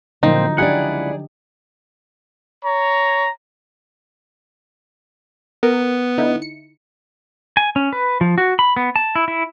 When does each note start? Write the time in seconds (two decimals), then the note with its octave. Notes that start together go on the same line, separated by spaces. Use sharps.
0.23 A#2 D3 F3 F#3 C4 D#4
0.58 C#2 D4 E4 G4 G#4 D5 D#5 F#5
2.63 C#5 A#5
5.63 B3 A#4
6.18 D3 D#4 E4
6.42 C#7
7.57 G#5
7.76 C#4
7.93 B4
8.21 F3
8.38 F#4
8.59 B5
8.77 B3
8.96 A5
9.16 E4
9.28 E4